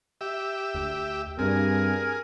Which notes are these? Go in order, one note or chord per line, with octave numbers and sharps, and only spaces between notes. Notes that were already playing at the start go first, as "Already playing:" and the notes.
G4 E5
D2
G2 C4 G#4 A#4